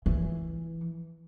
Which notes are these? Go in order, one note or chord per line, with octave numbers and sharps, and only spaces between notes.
E3